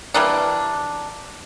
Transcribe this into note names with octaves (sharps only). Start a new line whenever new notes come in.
E3 G3 A#3 D4